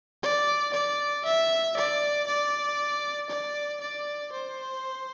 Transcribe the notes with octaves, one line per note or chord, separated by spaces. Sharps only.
D5
D5
E5
D5
D5
D5
D5
C5